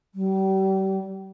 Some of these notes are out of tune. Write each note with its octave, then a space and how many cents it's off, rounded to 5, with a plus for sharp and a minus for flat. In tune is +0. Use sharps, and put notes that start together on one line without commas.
G3 -35